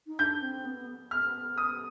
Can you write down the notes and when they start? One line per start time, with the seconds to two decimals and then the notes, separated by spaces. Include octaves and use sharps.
0.07 D#4
0.19 D4 G6
0.42 C4
0.65 B3
1.11 B3 F6
1.58 D#6